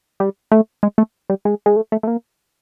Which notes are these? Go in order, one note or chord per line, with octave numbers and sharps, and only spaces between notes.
G3
A3
G#3
A3
G3
G#3
G#3
A3
A3
A3
A#3